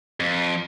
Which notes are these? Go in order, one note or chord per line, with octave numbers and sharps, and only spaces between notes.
F2